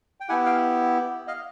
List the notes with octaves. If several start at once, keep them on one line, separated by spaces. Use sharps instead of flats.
G5
B3 E4 G4 F#5 G#5
F5 G5
D#5 F5